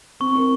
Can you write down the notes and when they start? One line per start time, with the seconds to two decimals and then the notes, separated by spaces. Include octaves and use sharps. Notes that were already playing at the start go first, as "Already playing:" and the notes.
0.20 C4 C#6
0.36 A#4